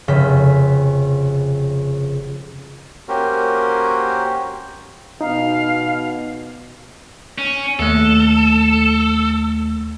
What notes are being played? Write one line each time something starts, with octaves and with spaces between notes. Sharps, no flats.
F1 C#3 B6
A#3 C#4 F#4 G4 A#4 C5
B2 D#4 F5
C#4
D#2 A3 A4